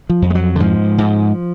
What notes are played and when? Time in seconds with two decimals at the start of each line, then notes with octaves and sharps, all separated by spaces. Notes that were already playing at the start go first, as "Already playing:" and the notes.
0.10 F3
0.22 F2
0.30 G#3
0.35 F#3
0.56 D3
0.60 G#2 F3
0.98 G#2